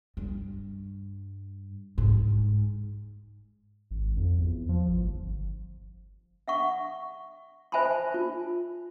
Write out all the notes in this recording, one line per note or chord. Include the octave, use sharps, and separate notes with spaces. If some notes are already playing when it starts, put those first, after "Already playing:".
G2
G#2
G#1
F2
E2
F3
G#1
G1
E5 F#5 C#6
C5 E5 G#5 A5 B5 C6
F4